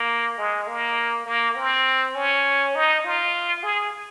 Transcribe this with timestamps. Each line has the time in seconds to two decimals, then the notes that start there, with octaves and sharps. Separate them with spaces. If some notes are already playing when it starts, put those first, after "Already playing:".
Already playing: A#3
0.38 G#3
0.67 A#3
1.26 A#3
1.55 C4
2.15 C#4
2.75 D#4
3.04 F4
3.63 G#4